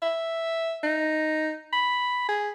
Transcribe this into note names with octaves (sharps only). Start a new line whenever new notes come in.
E5
D#4
B5
G#4